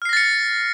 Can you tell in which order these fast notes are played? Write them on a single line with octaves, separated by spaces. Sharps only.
F6 C7 A#6 A6 C#7